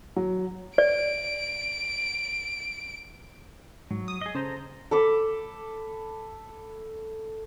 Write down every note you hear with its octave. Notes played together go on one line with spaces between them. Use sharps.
F#3
D5 D7
G#2 F#3
D#6
G#4 D#5
C#3 A4 C5 A#5
A4 B5 D6